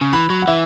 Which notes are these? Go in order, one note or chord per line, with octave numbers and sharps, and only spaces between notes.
C#3
E3 B5
F#3
F#5
E3 E5